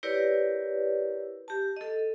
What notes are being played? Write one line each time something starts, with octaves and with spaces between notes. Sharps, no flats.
E4 G4 A#4 B4 C#5 D5
G4 A5
A4 D#5